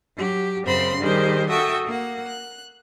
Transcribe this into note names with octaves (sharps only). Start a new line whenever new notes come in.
F#3 G4
F#2 C#3 C4 C5 B5 C6
D#3 G3 G4 G#4 C5
F#4 A4 E5 G5 C#6 D#6
A#3 F#5
F#6